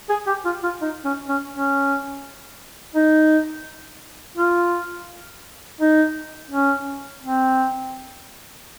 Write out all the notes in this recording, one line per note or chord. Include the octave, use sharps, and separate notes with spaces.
G#4
G4
F4
F4
D#4
C#4
C#4
C#4
D#4
F4
D#4
C#4
C4